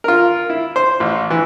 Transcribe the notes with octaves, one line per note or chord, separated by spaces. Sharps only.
F4 A#4
E4
C5
A1
E3